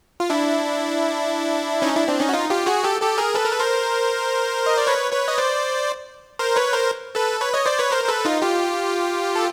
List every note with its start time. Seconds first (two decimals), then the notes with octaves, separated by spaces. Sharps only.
0.20 F4
0.30 D4 E4
1.82 C#4 D#4
1.95 D4 E4
2.08 C4 D4
2.20 C#4 D#4
2.29 F#4
2.33 D#4 F4
2.50 F4 G4
2.66 F#4 G#4
2.84 G4 A4
3.01 G4 A4
3.18 G#4 A#4
3.35 A4 B4
3.44 A#4
3.52 B4
3.60 A#4 C5
4.66 D#5
4.77 D5
4.87 B4 C#5
5.12 B4 C#5
5.28 D#5
5.38 C5 D5
6.39 A#4 C5
6.56 B4 C#5
6.73 A#4 C5
7.15 A4 B4
7.40 B4 C#5
7.53 C#5 D#5
7.66 C5 D5
7.79 B4 C#5
7.91 A#4 C5
8.04 C5
8.08 A4 B4
8.25 D#4 F4
8.42 F4 G4
9.35 A4